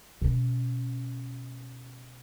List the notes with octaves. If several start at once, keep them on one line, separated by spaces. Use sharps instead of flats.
B2 C#4